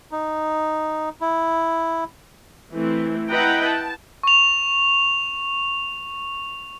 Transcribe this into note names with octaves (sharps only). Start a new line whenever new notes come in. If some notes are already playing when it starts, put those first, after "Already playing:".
D#4
E4
E3 A3 C4
E4 B4 D#5 F#5 G5 A#5
A5
C#6 F7